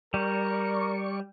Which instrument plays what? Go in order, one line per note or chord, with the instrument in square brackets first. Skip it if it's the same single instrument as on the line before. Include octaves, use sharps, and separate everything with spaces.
[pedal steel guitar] G3 [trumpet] A#4 [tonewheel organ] D5 C#6